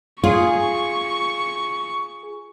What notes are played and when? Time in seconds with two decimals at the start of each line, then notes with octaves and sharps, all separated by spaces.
0.24 F4 G#4 C#6